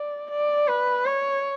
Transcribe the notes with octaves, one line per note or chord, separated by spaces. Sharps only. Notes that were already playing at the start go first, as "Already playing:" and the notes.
Already playing: D5
D5
B4
C#5